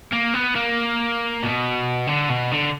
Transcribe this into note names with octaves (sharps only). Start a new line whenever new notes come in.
A#3
B3
A#3
B2
D3
B2
D3